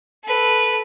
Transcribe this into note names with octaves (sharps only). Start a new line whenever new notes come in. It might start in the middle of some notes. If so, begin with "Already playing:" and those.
A4 B4